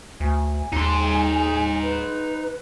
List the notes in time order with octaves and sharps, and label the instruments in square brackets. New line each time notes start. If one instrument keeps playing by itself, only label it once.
[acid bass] D2 [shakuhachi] G#5
[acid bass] D#2 [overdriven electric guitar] D#4 C6
[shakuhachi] B4